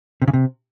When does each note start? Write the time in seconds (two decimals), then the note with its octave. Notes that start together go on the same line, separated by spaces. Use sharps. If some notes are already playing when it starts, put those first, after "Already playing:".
0.22 C3
0.28 C#3
0.33 C3